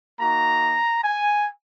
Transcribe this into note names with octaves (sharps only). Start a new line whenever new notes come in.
A#3 D#4 F#4 A#5
G#5